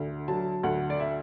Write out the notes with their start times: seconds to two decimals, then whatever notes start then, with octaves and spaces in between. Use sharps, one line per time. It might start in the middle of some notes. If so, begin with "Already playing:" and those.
Already playing: D2
0.28 F#3 A5
0.63 D2 F#5
0.90 D5
1.00 E5